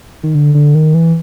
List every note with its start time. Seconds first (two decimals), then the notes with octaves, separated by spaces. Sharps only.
0.23 D#3
0.35 D3
0.55 D3
0.75 D#3
0.94 E3